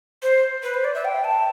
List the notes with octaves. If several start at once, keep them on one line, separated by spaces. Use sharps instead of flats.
C5
B4
C5
D5
E5
G5
A5